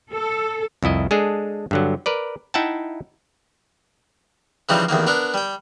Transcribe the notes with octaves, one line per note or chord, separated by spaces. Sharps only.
A4
C2 F2 E4 D#5
G#3 D4 G#4 A4
G2 D3 F#3
A#4 B4 D5
D#4 E4 E5 F#5 G5 A5
C#3 E3 F3 G3 C4 D#4
A1 E2 D#3 A#3
B3 D4 A#4
G3 G5